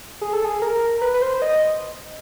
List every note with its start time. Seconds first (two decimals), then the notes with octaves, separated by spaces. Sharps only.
0.21 G#4
0.33 A4
0.44 G#4
0.62 A#4
1.02 B4
1.14 B4
1.22 C5
1.42 D#5